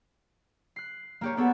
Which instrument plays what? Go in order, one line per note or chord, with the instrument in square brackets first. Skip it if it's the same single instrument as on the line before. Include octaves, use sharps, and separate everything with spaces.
[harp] F#6 C7
A#3 G4 C#5
[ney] B3 [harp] G4 A4 C#5